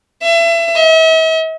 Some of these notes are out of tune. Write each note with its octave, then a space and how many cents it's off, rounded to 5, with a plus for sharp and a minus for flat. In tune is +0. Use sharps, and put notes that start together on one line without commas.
E5 +30
E5 -45